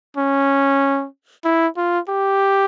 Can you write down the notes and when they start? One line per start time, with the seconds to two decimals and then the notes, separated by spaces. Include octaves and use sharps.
0.17 C#4
1.45 E4
1.77 F4
2.09 G4